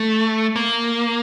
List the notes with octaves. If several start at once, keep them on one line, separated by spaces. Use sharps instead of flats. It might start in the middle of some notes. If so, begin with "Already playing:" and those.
Already playing: A3
A#3